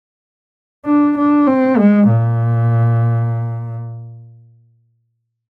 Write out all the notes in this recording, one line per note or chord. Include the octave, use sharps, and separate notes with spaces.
D4
D4
C4
G#3
A#2